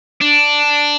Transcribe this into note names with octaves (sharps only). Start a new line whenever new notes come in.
D4